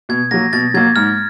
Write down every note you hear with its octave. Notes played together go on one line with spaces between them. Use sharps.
B2 G#6
F#3 A#3 A#6
B2 A6
F#3 A#3 G#6
G#2 F6